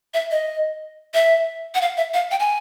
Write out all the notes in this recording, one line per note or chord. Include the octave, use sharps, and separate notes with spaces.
E5
D#5
E5
F#5
F5
E5
F5
G5
G#5